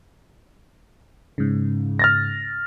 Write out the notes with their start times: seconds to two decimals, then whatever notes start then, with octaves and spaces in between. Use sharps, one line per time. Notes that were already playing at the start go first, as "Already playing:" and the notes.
1.38 G#2 C#3
1.99 F6 A6 A#6